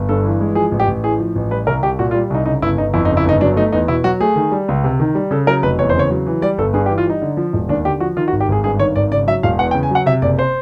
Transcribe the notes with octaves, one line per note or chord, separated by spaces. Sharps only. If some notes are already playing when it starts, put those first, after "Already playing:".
Already playing: G1
G2 A4
E3
G#3
F3 G#4
A1
G4
A1
A2 G#4
F3
A1
G3 B4
C2 A#4
C2 G4
A#2 F#4
F4
G3
C2 D#4
C#3 D#4
G1 E4
G1 D#4
F2 E4
D#4
C#3
E4
G1 D#4
F#3 D4
A3 D#4
E2 D#4
B2 E4
F#3 F#4
A3 G#4
D#3
G3
C#2
C3
D#3
G3
C#3 A4
F#3 A#4
F1 B4
E2 C#5
C5
C#3 C#5
F#3
E3
G3 D5
G1 A4
G2 G#4
G4
E3
F4
G3 D#4
D3
F3
E1
D#2 D4
D3 G4
F3 F#4
D#3 F4
F#4
G#1
G4
G#1 G#4
G2 G#4
D#3 C#5
G#1 D5
C#3 D5
F#3 E5
E1 F5
E2 F#5
G5
C#3
G#5
F#3 F#5
C3 E5
F#1 D5
C5